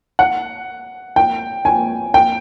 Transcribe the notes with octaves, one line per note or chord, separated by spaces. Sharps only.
F#5
G5
G#5
G5